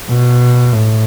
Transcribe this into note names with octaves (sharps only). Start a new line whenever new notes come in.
B2
A2